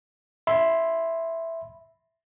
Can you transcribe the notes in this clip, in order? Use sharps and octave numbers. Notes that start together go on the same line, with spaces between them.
E5 B5 C6